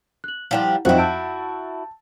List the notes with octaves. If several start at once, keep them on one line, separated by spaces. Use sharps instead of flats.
F#6 F#7
F3 G3 D4 E4 F#5
F2 F3 D#4 E4 F#4 C5 F5 G5
A5 E6 G6 D7